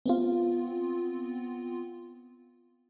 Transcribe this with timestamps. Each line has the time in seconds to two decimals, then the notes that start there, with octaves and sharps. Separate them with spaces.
0.06 B3 C4 F4